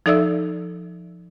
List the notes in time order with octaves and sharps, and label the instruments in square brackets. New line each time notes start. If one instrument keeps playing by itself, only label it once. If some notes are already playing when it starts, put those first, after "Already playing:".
[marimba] F3 D#4 A4 D5 E5 E6